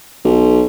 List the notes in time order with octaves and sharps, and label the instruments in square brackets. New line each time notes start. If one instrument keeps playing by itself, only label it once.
[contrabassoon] B1